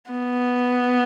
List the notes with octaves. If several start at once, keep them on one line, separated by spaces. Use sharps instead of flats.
B3